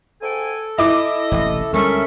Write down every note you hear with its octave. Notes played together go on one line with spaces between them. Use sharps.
G#2 A4 G5 G#5
E4 D#5 D6
E1 A1 C3
D2 G3 G#3 C#4 A4 A#4 E5 C#6